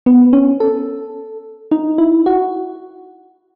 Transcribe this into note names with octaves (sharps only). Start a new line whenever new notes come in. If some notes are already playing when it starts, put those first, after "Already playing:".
B3
C#4
A4
D#4
E4
F#4